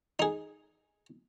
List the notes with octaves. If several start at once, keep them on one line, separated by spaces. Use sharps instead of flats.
D#4 G#4